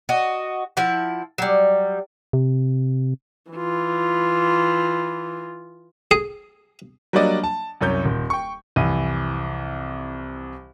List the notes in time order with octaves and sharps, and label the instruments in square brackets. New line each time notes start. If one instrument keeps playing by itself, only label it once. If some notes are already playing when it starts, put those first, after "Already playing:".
[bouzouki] F#4 D#5
F3 E4 F#5
F#3 G3
[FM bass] C3
[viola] E3 F4
[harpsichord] G#4
[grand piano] F#3 G3 A#3 D4 D5 D#5
A5
C2 F#2 C#4 G6
D#1
G5 C#6
C2 F2 E3 D#7